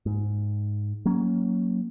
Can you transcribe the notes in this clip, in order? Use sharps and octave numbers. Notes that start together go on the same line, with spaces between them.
G#2
F#3 A#3 C#4